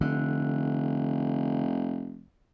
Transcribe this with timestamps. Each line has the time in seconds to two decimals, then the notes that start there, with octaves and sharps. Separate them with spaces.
0.01 F1 D3